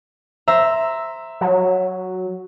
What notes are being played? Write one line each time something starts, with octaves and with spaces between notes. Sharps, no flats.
C5 E5 A#5 E6
F#3